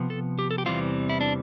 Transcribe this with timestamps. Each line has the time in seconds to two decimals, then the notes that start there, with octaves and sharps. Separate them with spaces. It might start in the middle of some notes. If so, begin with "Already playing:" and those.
Already playing: C3 F3 B3
0.10 A4
0.39 G4
0.51 A4
0.58 G4
0.66 E2 C3 E3 G3 C4 F4
1.09 E4
1.21 D4